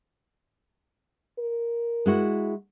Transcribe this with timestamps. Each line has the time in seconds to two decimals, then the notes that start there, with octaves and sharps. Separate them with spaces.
1.39 A#4
2.06 G#3 E4 F#4